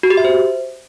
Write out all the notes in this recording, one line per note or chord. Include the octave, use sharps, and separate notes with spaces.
F#4
G4
E5
C5